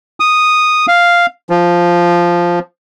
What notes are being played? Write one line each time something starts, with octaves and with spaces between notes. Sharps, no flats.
D#6
F5
F3